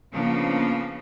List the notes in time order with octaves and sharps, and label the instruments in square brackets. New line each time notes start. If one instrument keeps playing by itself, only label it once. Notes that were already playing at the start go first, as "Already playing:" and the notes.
[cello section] C#3 F3 A#3 B3 D4